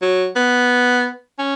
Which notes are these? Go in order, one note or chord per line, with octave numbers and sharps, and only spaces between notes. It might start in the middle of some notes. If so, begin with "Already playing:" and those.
F#3
B3
C#4